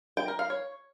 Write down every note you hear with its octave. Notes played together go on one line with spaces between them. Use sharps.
G5
A#4
F5
C#5